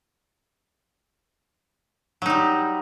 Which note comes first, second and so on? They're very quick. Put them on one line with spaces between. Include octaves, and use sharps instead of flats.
F#3 D#4 G3